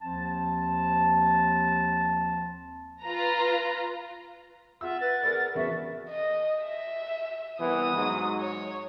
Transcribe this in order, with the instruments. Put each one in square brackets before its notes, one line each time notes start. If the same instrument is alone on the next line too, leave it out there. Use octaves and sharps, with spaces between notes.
[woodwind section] D#2 F3 C4 A5
[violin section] F4 B4 A#5
[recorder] F4 [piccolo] E5 [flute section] F#5 [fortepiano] E6
[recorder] B4 [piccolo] A6
[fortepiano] G#4 B4 D5 [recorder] A#4
[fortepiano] E2 C#3 B3 [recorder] F#4 [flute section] E5
[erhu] D#5
E5
[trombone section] C2 E3 B3 [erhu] D#6
[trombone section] G#2 F#3
[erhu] C#5